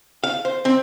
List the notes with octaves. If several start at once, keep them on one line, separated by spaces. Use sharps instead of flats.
F5
C5
C4